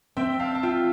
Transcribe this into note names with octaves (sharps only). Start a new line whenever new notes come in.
C4 E5 G5
F5 A5
A5
F4 E5 G5